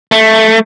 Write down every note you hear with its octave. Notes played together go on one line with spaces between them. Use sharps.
A3